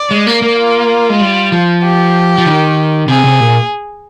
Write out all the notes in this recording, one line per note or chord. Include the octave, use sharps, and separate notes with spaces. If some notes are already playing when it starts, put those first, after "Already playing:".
Already playing: D5
G#3
A#3
A#3
F4
G#3
G3
F3
G4
F3
D#3
C3 G#4
C3
A#2